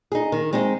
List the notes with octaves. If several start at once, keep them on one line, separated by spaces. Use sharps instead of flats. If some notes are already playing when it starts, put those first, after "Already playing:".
D#4 G#4
D#3
G#3 C4 D#4 G#4